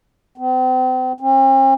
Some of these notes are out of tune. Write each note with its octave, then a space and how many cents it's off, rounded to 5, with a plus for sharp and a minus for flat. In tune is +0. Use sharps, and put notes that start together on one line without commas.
C4 -40
C4 +45